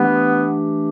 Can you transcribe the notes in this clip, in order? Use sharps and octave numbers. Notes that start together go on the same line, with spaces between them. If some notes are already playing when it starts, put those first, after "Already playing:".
Already playing: E3 A3 B3 D4 G4